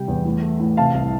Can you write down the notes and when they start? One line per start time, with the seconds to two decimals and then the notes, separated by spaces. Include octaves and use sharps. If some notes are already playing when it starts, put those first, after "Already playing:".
Already playing: C3 G3 G5
0.08 E2
0.25 A2
0.42 A3
0.60 A2
0.77 C3 F5 A5
0.94 C2